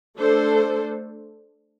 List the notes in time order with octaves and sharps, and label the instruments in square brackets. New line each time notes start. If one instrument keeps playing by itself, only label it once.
[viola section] A3 D4 A4 C5